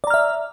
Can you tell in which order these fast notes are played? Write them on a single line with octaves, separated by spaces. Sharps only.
D5 A#5 F6 E5